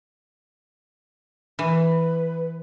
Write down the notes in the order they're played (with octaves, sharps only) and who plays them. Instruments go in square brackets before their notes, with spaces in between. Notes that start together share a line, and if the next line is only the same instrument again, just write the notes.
[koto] E3 [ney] B4